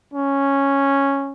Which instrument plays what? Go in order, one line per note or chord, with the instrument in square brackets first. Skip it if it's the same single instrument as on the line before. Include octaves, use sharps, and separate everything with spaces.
[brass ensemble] C#4